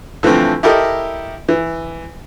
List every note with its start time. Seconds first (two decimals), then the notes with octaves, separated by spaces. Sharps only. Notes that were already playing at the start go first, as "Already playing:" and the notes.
0.23 D3 E3 F3 A3 C4
0.63 E4 G4 A4 A#4 D#5
1.49 E3